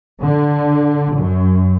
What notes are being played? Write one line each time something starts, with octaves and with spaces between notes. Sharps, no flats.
D3
F#2